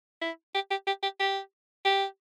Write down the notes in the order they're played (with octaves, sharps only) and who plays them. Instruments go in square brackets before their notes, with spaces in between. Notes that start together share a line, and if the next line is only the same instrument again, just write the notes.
[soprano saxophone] E4
G4
G4
G4
G4
G4
G4